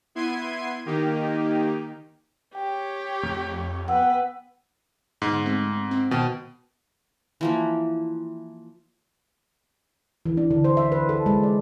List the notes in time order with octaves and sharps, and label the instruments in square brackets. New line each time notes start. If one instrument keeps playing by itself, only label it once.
[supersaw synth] B3 E4 C6 G#6 C7 D#7
D#3 A#3 D#4 G4
[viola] G4 C#5 [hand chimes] G5
[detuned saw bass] F2 [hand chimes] A3
[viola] B3 B4 [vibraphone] F#5 [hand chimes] G5 E6
[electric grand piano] G#2 [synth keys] D3 G#3 B3
[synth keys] G#3 A3 C4
C4
[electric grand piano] B2 [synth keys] D#3 C5 G5
[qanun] E3 F3 A#3
[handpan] E3
D4
D3
C5
E5
B4
A4
G#3
D5